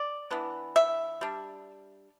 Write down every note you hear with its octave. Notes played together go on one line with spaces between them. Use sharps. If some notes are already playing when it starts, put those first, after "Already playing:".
Already playing: D5
E3 B3 D4
E5
G3 D4